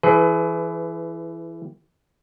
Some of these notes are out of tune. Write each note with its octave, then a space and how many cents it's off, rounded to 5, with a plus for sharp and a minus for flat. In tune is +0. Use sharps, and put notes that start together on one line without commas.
E3 +10 G#4 +40 B4 +30